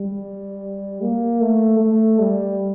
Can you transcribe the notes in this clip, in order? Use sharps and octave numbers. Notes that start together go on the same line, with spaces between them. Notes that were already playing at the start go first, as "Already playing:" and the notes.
Already playing: G3
A#3
A3
A3
G3